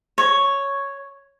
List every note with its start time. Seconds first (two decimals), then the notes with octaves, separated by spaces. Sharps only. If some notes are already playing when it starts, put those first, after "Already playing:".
0.18 C#5